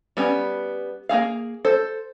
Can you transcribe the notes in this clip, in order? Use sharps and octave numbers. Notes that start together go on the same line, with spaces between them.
G3 B3 C#4
A#3 D#4 G#4 F5
A4 C5